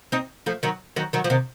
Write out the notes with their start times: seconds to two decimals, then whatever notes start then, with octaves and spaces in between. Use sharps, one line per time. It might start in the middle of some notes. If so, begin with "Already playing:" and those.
0.12 C4 D#4
0.46 F3 A3
0.63 D#3 F#3
0.96 D#3 F#3
1.13 D#3 F#3
1.24 F3
1.30 C3 D#3